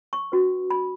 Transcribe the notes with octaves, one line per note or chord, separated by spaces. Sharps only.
C#6
C#4 F#4 B4
B5